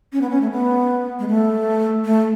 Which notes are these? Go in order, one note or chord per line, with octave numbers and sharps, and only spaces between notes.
C#4
B3
C#4
A3
B3
G#3
A3
A3